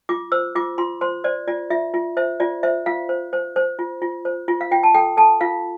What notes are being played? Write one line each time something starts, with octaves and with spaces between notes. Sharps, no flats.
F4 D6
C5 E6
F4 D6
F4 C6
C5 C6
C5 D5
F4 D5
F4 E5
F4
C5 E5
F4 D5
C5 E5
F4 F5
C5
C5
C5
F4
F4
C5
F4
F5
F4 G5
A5
A4 G5
A4 A5
F4 F5